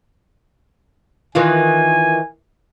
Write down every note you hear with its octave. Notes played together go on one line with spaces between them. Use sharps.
D#3 E3 F4 G#5